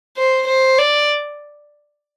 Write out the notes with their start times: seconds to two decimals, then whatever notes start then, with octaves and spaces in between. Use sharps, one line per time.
0.18 C5
0.48 C5
0.79 D5